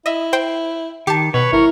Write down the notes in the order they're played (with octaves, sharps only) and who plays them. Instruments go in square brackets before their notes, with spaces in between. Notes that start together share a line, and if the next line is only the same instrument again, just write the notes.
[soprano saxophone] E4 [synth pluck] D#5 E5
[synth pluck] C5 G5
[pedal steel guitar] D#3 [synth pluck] G4 A5
[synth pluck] B2 [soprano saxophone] B4 [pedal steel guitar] C#5
[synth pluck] G#1 [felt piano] E4 [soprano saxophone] A#4